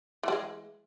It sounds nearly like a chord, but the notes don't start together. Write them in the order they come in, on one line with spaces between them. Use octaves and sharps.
E3 G3 G#3